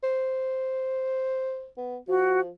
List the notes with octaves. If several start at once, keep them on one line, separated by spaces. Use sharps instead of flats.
C5
B3
F3 F#4